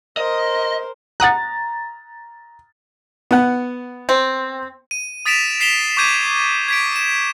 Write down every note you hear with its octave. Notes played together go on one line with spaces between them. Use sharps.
A#4 C5 D#5
F#5 A#5 D#6 F#6 A6
B3 F#5
C4
D#7
D#6 A6 B6 D7 E7 F7
B6 C7 E7 F7 G7
C#6 D6 G6 G#6 D#7
G#6 B6 D7
E7